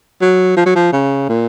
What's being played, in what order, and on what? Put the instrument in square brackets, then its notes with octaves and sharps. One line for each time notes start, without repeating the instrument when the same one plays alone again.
[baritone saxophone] F#3
F3
F#3
F3
C#3
A#2